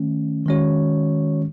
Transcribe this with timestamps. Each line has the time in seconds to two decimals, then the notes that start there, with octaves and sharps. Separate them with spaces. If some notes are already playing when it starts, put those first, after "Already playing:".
Already playing: D#3 A3 C#4
0.46 D#3 G#3 C#4 F#4 C#5